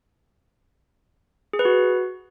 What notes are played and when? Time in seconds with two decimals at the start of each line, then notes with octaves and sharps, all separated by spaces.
1.53 G#4
1.59 B4
1.65 F#4